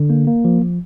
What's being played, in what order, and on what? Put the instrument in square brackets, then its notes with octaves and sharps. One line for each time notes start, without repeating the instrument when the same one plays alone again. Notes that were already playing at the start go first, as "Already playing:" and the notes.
Already playing: [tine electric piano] D3
A#3
A#3
F3
F3